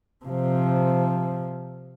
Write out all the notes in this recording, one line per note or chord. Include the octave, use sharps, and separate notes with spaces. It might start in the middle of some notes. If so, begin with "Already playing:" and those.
C3 F3